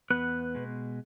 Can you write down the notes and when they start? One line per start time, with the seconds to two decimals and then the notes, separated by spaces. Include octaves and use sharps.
0.10 E2 B3 B4
0.55 B2 G#3